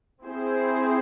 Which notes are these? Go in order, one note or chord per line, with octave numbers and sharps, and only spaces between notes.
C4 E4 G#4 C5